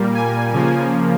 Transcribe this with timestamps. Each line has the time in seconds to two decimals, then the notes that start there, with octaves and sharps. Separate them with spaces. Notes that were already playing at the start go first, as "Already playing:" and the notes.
Already playing: A#2 G3 A#3
0.15 G#5
0.53 C#3 F3 A#3